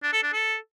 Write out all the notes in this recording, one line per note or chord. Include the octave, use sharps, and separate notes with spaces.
D4
A4
D4
A4